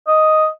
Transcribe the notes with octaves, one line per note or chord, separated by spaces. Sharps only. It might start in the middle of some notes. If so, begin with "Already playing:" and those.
D#5